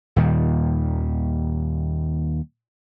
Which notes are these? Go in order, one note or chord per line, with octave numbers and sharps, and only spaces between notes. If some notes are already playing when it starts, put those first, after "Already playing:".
D#2 A#2 D#3 G3